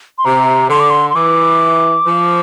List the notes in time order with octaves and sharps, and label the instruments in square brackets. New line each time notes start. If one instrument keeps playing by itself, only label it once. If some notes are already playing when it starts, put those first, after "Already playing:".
[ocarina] C6
[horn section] C3 [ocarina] A#5
[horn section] D3 [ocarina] C6
[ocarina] D6
C6
C6
[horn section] E3 [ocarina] D6
[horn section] F3